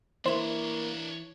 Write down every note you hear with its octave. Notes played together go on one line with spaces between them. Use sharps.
E3 A#3 D4 E4 C5 C#5